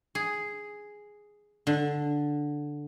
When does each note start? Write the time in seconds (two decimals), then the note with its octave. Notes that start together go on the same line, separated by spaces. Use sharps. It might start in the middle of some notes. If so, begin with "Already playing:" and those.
0.15 G#4
1.67 D3